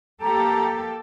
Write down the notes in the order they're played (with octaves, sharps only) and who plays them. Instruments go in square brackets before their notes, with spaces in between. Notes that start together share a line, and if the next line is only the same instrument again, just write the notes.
[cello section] A#3 G4 A4 [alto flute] A#5